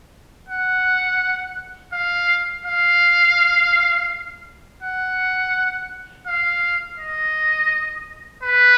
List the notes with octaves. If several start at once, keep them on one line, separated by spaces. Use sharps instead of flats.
F#5
F5
F5
F#5
F5
D#5
B4